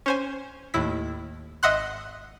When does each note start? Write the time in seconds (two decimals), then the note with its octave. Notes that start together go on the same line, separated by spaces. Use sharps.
0.06 C#4 C5 G#5
0.74 D#2 A2 E4 B6
1.63 G#1 D#5 E5 F#5 C6 F#6